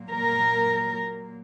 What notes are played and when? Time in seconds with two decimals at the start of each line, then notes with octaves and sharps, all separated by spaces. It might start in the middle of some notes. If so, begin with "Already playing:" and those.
Already playing: A#2 F#3 A#3
0.10 A#4